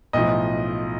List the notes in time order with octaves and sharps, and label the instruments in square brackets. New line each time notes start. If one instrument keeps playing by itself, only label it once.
[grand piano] B1 A2 F3 D#5